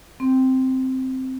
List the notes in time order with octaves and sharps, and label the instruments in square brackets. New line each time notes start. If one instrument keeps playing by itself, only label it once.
[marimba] C4